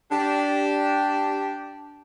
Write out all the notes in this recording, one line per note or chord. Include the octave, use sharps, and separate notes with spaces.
D4 G4